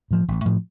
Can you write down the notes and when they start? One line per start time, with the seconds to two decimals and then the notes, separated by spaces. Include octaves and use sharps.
0.11 A2 F3
0.28 A1
0.45 A2 F3